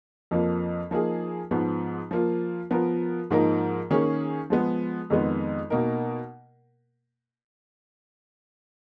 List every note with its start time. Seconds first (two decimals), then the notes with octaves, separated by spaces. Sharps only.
0.31 F2 F3 A#3
0.91 F3 A#3 D#4 G#4
1.51 G#2 F3 B3
2.11 F3 A#3 F4
2.71 F3 B3 F4 A#4
3.30 G#2 F3 A#3 D#4 A#4
3.90 D#3 A#3 C#4 G#4
4.50 F3 G#3 B3
5.10 F2 D#3 G#3 B3
5.70 B2 A#3 D#4 A#4